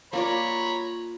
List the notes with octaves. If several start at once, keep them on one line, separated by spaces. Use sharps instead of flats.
A#3 F4 C#5 D5 A#5 B5